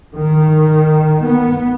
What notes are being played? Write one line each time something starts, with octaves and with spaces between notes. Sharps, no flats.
D#3
B3